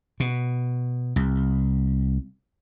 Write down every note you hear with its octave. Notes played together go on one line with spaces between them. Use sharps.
B2
C2